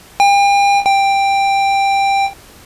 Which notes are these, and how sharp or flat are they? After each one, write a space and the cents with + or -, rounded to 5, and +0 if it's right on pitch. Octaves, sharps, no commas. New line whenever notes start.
G5 +40
G5 +10